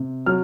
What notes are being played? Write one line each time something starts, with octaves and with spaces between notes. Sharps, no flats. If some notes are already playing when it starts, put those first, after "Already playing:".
Already playing: C3
F#3 F6